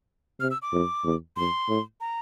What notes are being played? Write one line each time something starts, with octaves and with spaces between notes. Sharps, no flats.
C3 F6
E6
D6
F2
E2
F2 C6
A2
A#5